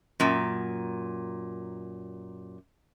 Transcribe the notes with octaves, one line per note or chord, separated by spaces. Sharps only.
F#2 A#2